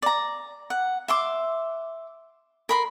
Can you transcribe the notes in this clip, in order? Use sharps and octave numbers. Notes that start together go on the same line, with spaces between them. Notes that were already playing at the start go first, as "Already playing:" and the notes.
D5 A#5
F#5
E5 C6 D6
A#4 B5 C6